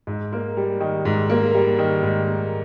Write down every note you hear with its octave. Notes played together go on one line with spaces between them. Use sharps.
G#2
A#3
G3
D#3
G#2
A#3
G3
D#3
G#2
A#3